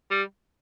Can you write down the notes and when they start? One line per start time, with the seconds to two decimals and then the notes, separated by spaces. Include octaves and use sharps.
0.11 G3